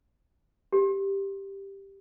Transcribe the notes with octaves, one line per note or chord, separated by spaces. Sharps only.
G4